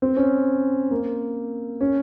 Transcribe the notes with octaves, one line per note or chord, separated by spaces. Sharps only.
C4
C#4
A#3
C#4